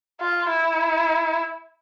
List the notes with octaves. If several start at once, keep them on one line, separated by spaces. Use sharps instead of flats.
F4
E4